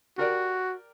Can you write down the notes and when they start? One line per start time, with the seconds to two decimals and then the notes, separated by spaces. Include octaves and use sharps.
0.18 F#4 G4 A#4 D5